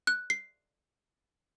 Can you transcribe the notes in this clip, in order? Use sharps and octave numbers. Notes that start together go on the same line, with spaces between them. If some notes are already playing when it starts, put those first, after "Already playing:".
F#6
C7